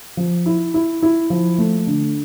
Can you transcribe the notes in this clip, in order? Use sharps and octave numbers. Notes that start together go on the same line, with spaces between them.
F3
E4
E4
E4
F3
A3
D3